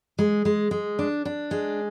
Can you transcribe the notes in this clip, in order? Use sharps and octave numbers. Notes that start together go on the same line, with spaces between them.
G#3
G#3
G#3
D4
D4
G#3